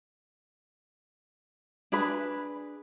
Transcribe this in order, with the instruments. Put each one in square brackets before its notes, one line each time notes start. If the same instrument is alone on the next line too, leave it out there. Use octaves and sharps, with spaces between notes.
[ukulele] D4 G#4 B4 B5